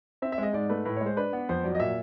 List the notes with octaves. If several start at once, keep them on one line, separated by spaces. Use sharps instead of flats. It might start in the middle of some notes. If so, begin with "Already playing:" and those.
C4 E5
E5
G#3 D#5
G#2 D5
A3 B4
A2 B4
G#3 C#5
C5
D4 B4
B3
F2 C5
F#3 D5
D#5
A#2 E5